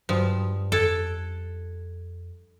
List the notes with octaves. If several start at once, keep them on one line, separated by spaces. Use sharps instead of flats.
G2 F3 F#3 D#6
F2 A4 F#6 G#6 D7